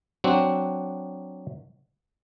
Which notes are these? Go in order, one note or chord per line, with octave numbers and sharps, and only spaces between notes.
F#3 C4 D4 F#4